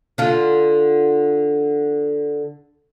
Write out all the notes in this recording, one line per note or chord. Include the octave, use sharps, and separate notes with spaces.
D3 F4